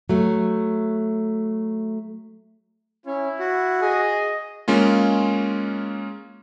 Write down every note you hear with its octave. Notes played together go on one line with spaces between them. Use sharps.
F#3 A3
C#4 E4
F#4
G#4 D#5
G#3 A#3 C#4 F4